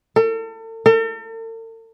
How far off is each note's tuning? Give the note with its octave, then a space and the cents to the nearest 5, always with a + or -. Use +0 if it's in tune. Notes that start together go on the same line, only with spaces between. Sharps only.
A4 +40
A4 +45